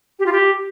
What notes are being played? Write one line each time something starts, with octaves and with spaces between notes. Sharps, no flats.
G4
F4
G4